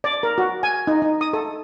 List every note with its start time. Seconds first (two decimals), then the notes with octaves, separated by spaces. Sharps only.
0.04 D5
0.23 A#4
0.38 F#4
0.63 G#5
0.87 D#4
1.02 D#4
1.21 D#6
1.33 A4